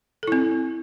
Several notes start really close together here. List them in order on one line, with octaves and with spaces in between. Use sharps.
A4 E4 C4